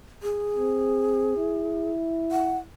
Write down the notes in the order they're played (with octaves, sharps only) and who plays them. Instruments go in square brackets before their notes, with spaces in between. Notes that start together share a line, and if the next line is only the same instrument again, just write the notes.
[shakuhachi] G#4
[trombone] C4
E4
[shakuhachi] F#5